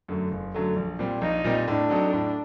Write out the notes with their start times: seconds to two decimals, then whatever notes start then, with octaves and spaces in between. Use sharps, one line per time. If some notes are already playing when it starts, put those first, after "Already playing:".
0.08 F#2 D3 F#3 A3
0.31 F#1
0.54 F#2 D3 F#3 A3
0.76 A#1
0.99 A#2 G3 C4
1.21 A#1 D#4
1.44 A#2 G3 C4
1.67 A2 D4
1.90 F#3 C4 D#4 A4
2.13 A2